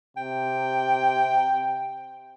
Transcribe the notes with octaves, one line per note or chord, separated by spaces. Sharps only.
C3 G5